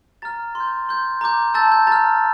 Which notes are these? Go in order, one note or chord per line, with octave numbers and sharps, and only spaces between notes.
A#5 F6 A6
C6
G6
C6 G6
A#5 D6 G6
A5 E6 G6 A6
G6
A#5 F6 A6